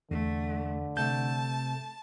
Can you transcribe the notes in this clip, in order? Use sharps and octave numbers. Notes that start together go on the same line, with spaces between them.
E2 D3 A3
C3 A3 A5 G6